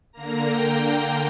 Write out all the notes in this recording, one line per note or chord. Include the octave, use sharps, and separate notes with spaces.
D3 A#3 A#5
G5